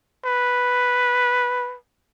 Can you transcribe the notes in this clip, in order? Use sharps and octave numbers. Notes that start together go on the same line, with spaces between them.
B4